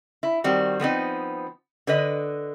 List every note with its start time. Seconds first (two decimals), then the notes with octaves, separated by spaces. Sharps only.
0.23 E4
0.44 D#3 G3 C4 F#4
0.80 F3 B3 C4 D#4
1.87 D3 B4 D#5